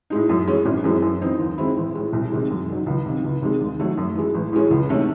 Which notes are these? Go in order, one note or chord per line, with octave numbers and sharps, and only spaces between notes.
A2 G#3 D#4
F#2
E3 G#3 C#4
G#1
F#2 E3 G#3 C4
F#2
E3 C4 D#4
D#2
D#3 G#3 C4 E4
A1
A2 G#3
C2
C3 D#3 G#3
F#2
D#3 F#3
C#2
C3 D#3
C#2
C3 D#3 G#3
D#2
D#3 F#3 A3
F#2
E3 G#3
A1
A2 E3 G#3 C#4
C#2
C3 D#3 A3 C#4